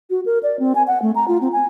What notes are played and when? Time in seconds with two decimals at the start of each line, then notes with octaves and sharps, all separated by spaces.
0.10 F#4
0.26 A#4
0.43 D5
0.60 C4
0.75 G#5
0.87 F#5
1.02 A3
1.16 A#5
1.28 F4
1.41 C4
1.53 G#5